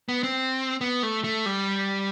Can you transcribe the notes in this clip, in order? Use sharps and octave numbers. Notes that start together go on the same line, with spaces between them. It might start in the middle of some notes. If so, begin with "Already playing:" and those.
B3
C4
B3
A3
A3
G3